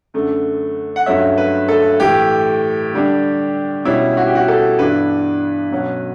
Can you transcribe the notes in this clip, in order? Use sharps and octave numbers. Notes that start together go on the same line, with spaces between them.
F#2 D3 A3
F#5
G2 F#3 A3 C#4 E5
B4
A4
A2 E3 A3 G4
D3 G3 D4
B2 G3 C#4 E4
F#4
G4
F#4
A4
G2 E3 B3 D4 B4
B2 F#3 C#4